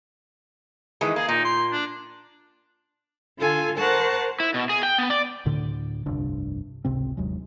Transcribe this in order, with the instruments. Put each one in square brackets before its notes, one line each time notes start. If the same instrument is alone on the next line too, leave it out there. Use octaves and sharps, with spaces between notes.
[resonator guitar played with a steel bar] D#3 E3 G#3
[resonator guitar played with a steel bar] A#3 [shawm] G#4
[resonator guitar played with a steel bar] A#2 [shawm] D#4
[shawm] C6
D4
[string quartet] D3 F4 A4 G#5
A#4 C5 F#5 A5 C#6
[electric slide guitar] E4
B2
G#4
G5
B3
D5
[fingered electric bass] D2 A2 D3
F1 C2 G2 D4
G#1 C#2 C3 C4
G1 D#2 F#3 G#3